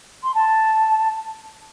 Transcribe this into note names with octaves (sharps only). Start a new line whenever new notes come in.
C6
A5